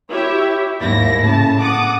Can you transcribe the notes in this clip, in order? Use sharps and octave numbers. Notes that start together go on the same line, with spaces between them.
E4 G4 C#5 E5
D#2 G#2 E4 A#6
A2 C#3 A5
F#5 D6 D#6